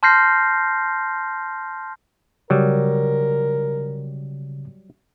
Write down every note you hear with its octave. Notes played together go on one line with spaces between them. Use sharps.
A5 C6 F6 G6 A#6 C7
C#3 F#3 G3 A#4